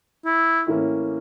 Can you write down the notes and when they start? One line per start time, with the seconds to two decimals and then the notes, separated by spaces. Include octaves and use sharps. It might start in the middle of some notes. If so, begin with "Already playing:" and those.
0.25 E4
0.66 A2 E3 A#3 C#4